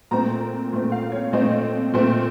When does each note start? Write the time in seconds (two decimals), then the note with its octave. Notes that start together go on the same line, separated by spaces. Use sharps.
0.11 A#2 A3 C4 A#5
0.72 A#2 A3 C4
0.92 F5
1.12 C#5
1.32 A#2 A3 C4 D#5
1.94 A#2 A3 C4